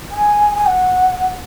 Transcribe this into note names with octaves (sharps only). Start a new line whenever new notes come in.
G#5
G#5
F#5